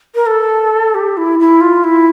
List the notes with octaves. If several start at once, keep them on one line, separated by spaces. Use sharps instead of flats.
A#4
A4
G4
E4
E4
F4
E4